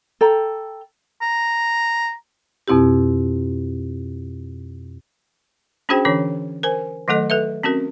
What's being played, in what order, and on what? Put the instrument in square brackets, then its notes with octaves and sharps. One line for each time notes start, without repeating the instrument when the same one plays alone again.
[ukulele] A4 G5 A#5
[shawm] A#5
[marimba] F2 B2 C4 E4 G4
[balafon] C#4 D4 F#4 G#4 C5 G5
D3 E3 C#4 D4 C#5
A#4 C5 G#5
D#3 F#3 A3 A4 D#5
A4 B4 E5
C4 C#4 F#4 A#4